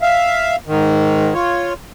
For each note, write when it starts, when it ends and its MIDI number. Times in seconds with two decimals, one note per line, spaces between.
0.02 0.56 76
0.02 0.56 77
0.67 1.34 44
0.67 1.34 51
1.34 1.73 65
1.34 1.73 73